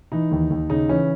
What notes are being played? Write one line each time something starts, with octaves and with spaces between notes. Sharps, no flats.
E3 D#4
D#2
D#2
C#3 D#4
E3 C#4